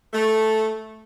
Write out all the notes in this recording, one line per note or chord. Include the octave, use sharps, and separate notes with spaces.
A3